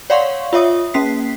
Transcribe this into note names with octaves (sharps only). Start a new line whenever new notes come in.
C#5 D5 F5 F#5 C6 C#6
F4 C#5 E5 D#6
A#3 C#4 B6 C7